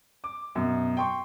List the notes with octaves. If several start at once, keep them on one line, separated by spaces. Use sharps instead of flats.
D6
F#2 B2
G5 C6 C#6